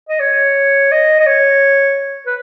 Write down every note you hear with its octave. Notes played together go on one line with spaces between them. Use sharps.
D#5
C#5
D#5
D#5
C#5
B4